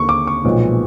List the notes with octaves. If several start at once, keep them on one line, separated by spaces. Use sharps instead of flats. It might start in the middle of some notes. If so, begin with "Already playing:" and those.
Already playing: D#2 D3 A#3 C#6
D6
C#6
B1 A#2 F3 G#3 B3